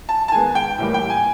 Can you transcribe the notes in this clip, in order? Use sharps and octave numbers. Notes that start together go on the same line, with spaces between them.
A5
A5
D#3 G#3 B3 G#5
G5
A2 E3 G3 A#3
G5
G#5